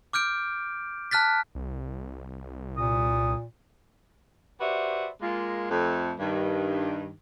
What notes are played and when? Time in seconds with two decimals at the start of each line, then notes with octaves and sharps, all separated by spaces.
0.13 D6 F6 G6 D7
1.11 A5 F6 F#6 A6 B6
1.55 C2
2.77 A#2 D#6
4.61 F#4 G4 B4 C5 D5 E5
5.22 G#3 A#3 F4
5.70 F2 A3
6.19 G2 D#3